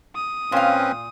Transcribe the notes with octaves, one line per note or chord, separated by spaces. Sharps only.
D#6
A#2 C4 C#4 B4 F5